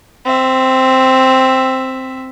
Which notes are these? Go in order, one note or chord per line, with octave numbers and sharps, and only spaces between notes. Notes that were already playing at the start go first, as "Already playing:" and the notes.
C4 E5